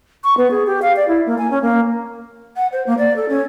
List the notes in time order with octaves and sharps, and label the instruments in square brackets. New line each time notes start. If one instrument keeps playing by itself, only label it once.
[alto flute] C#6
B3
G#4
G4
F5
D5
E4
A#3
G#5
C#4
A#3
[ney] F#5
C5
A#3
D5
A4
C#4